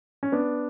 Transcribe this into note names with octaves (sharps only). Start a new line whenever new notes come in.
C#4
B3 D4